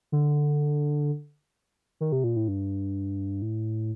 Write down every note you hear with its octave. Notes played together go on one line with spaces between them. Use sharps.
D3
D#3
C3
A#2
A2
G2
A2